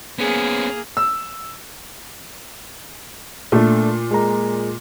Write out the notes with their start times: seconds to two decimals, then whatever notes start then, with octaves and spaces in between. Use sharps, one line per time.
0.18 A#3 B3 C#4 G#4
0.97 E6
3.52 A#2 A3 D4
4.11 G#3 A#4 A#5